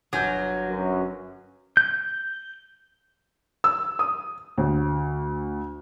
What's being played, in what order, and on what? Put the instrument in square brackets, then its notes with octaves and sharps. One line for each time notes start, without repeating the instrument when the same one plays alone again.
[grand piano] G1 G#5 G6 [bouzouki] F#3
[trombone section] F#2
[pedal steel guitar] G6
[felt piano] E6
D#6
D2